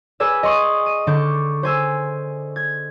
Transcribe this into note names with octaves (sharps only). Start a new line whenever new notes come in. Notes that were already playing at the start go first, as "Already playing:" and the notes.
G#4 B4 D5 G#5 E6
D#5 C6 C#6 D#6
D#7
D3 D4 C#6 D6 G6
C5 G#5 E6
G#6